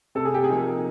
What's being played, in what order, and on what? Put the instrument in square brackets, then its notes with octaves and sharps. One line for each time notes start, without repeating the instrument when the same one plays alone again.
[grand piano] C3 [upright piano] A4
[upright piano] G#4
G4
G#4
[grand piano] F3 A#3 D#4